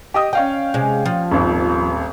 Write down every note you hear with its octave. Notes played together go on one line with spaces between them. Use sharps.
G4 D#5 D#6
C#4 D#5 F5 G5
C3 G#3
F3
D#1 G#1